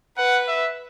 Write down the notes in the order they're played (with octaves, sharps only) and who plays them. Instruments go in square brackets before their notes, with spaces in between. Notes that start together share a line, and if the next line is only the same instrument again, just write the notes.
[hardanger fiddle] B4 [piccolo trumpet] F#5
[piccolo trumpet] E5